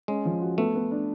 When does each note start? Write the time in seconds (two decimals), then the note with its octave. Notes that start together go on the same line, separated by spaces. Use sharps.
0.08 G#3 C#4
0.25 F3
0.42 F#4
0.58 A3 B3
0.75 B3
0.91 D4